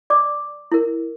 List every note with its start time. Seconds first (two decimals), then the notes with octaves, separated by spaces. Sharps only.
0.10 D5 D6
0.72 E4 A#4